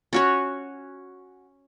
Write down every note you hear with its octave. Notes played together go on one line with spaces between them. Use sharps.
C#4 F#4 C#5